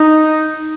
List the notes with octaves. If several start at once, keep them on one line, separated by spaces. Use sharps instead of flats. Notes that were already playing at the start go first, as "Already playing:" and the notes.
Already playing: D#4